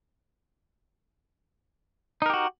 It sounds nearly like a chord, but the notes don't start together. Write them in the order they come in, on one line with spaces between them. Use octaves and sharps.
D#4 A#4 G4 F#4